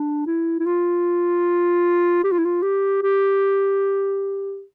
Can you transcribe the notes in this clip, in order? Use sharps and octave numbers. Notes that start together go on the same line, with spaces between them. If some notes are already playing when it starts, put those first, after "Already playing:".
Already playing: D4
E4
E4
F4
G4
F4
E4
F4
G4
G4